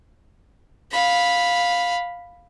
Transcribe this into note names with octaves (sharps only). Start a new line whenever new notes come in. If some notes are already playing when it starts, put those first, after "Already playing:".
F5 B5